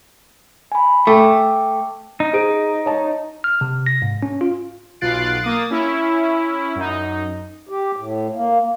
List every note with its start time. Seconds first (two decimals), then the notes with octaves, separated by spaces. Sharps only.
0.72 G#5 B5
1.07 A3 G5 D6
2.20 D#4
2.33 G#4 C5 D7
2.86 C#5 A5
3.44 F6
3.61 C3
3.86 A#6
4.02 G#2
4.23 C#4
4.41 F4
5.01 B1 F4 F#6 A6 C7 D7
5.41 A#3 D#6 A6
5.70 C#4 E4
6.76 F#2 D#4
7.69 G4
7.96 A2
8.34 A#3